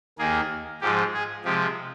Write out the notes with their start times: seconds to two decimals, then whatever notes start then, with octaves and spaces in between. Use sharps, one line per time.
0.19 D#2 D#3 A#3 G#4
0.81 G#2 F3 G#3 G4
1.14 G#4
1.44 C3 F3 G#3 G4